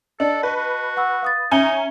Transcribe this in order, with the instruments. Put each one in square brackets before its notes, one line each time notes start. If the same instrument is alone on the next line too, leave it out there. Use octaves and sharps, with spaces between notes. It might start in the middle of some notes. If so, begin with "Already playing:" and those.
[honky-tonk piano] D4 [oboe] A4 [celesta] D#5 A5
[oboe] F#4 [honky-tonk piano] B4
[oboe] F#4
[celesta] F#5 C#6 E6
F5 D#6 A6
[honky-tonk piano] C#4 G#5 A#5 [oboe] D#4 [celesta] E5 C#7 G7